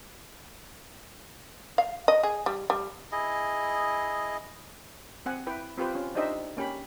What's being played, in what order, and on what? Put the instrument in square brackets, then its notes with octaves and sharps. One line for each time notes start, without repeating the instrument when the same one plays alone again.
[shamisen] F5
D#5
G#4
G3
G3
[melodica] E4 G#4 D#5
[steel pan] C4 F#5 G#5
E4 B4 G5
C4 F4 G4 B4 C5
C#4 F4
D4 D#4 G4 C5 D#5 E5
A#3 C#4 G4 B5